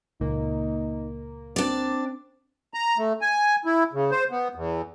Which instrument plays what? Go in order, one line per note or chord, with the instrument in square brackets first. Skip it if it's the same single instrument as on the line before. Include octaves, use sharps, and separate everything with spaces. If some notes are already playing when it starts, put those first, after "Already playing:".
[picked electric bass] C#2 A#2 [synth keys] A#3 [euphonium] D#4
[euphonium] C4 [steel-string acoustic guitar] D4 D5
[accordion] A#5
A3
G#5
E4
C#3
C5
B3
E2